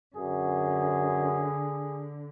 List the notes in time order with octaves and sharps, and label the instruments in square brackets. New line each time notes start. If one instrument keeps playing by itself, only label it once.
[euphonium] F#2 [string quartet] D3 [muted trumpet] G#4